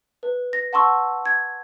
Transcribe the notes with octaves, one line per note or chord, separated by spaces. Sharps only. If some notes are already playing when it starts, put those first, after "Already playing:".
B4
A#6
F#5 A5 C6 C#6 E6
G#6